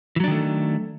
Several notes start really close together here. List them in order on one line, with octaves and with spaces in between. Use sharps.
E3 F#3 D4 D#3 A3